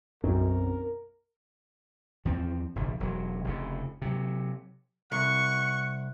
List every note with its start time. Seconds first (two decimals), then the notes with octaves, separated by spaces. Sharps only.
0.24 B1 F#2 C4 A#4
2.25 E2 F3 C4
2.76 F1 A#1 D3
3.00 E1 F#3
3.44 F1 F2 C#3
4.02 C3 F#3
5.12 C2 F#5 C#6